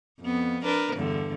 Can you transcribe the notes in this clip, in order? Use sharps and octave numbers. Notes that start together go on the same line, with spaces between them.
F2 B3
D4 A#4 B4
E2 G2 D3